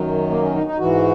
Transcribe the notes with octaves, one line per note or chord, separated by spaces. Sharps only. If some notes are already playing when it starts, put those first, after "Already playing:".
Already playing: F#2 D#3 F#3
A#3
C#4
D#4
D#4
G#2 E3 F#4